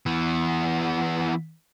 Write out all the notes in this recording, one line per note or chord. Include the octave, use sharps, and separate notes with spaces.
E3 B3